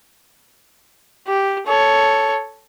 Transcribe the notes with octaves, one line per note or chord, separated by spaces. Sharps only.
G4
A4 C#5